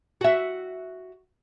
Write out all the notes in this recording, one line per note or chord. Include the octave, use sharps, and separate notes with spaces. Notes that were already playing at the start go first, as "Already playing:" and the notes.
F#4 E5